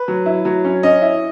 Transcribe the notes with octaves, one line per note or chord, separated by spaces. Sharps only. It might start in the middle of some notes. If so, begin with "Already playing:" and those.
Already playing: B4
F#3
E4
F#3
C#4
C#4 D#5
E4